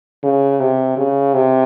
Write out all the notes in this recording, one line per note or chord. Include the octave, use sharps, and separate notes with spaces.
C#3
C3
C#3
C3